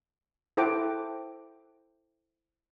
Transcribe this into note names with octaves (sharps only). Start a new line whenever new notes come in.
E4 A4 C5 F#5 G5 D6